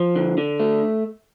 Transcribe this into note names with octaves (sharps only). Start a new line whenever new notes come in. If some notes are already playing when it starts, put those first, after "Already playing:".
Already playing: F3
D3
D3
A3